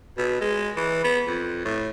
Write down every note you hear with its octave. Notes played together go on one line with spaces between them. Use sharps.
B2
G#3
E3
B3
F2
A2